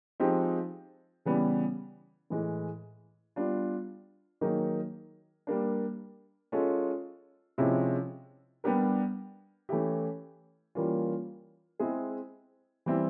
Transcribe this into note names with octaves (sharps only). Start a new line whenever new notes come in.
F3 G#3 C4 D#4 G4
C#3 E3 G3 B3
A2 E3 G#3
G3 B3 D4 F4
D#3 F#3 A#3 D#4 G#4
G3 A#3 D4
G#3 C#4 F4 A4
C3 F3 G#3 C#4 E4
G3 B3 D4 G4 A#4
E3 A3 C#4 E4 G4
E3 G3 A#3 C#4 F4
G#3 C4 E4 G#4
E3 G3 C4 E4